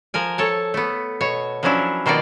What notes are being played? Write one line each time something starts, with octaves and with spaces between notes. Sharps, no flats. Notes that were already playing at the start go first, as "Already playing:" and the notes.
F3 A#4 G#5
A4 C#5 A5
A3 B3
B2 C#5
F3 F#3 C#4 D4 E4
B2 D#3 A#3 F4 D5